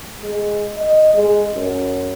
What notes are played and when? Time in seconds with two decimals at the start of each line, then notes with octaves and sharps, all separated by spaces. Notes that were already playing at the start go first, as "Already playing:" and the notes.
0.20 G#3
0.77 D#5
1.14 G#3
1.53 F#2